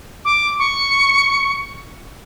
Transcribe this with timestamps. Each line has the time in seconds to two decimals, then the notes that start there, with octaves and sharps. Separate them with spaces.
0.25 D6
0.59 C#6